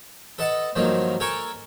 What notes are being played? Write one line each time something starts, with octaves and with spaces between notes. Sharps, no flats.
A4 B4 D#5 F#5 A5
G2 D#3 F3 F#3 A#3
A4 A#4 G5 G#5 A#5 C#6